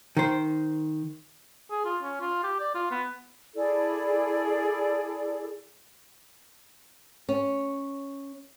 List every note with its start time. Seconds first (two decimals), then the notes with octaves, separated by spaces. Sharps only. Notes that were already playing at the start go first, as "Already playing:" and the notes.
0.17 D#3 C5
1.71 G#4
1.85 F4
2.02 C#4
2.21 F4
2.43 G4
2.59 D5
2.75 F4
2.91 B3
3.55 E4 G#4 A4 D5
7.29 C#4